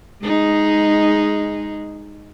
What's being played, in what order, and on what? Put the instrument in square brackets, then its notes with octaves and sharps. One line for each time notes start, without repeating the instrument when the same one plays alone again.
[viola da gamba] G#3 D#4 G#4